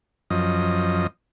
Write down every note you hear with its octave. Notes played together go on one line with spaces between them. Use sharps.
F#2 F3 D#5